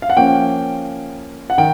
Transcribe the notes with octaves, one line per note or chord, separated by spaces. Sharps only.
F5
F#5
F3 A#3 C#4 G5
F#5
D#3 G5